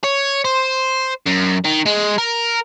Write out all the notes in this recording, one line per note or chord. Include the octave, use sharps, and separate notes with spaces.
C#5
C5
F#2
D#3
G#3
A#4